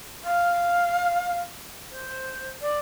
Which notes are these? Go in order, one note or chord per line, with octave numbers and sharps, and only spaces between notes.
F5
C5
D5